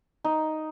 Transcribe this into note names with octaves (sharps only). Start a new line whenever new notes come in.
D#4